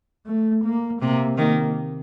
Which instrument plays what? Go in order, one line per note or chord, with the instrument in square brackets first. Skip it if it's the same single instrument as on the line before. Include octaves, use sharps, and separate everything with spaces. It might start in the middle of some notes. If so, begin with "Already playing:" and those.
[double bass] A3
A#3
[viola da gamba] C3 [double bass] A#3
[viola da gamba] D#3 [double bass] A#3